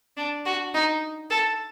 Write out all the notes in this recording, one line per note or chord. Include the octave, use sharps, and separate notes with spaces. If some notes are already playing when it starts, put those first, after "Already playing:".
D4
F#4
D#4
A4